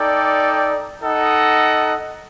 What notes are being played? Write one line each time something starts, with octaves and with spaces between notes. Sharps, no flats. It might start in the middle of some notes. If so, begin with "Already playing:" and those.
Already playing: D#4 A4 D5 G5
D#4 A4 D#5 F#5